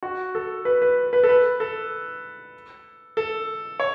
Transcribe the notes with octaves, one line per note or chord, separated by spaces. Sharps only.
F#4
A4
B4
B4
B4
A4
B4
A4
A4
C#5